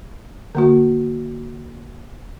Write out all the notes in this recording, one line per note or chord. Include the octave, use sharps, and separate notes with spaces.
D3 A#3 F#4